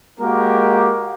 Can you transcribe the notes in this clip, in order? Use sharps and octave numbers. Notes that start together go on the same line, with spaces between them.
G#3 A#3 F#4 G4 A#4